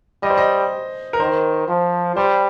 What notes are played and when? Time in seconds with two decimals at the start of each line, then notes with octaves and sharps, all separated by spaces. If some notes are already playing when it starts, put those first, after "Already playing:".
0.23 G3 D#5
0.30 C5
0.38 D#5
1.13 A#4
1.20 D#3 C5
1.68 F3
2.16 G3 C5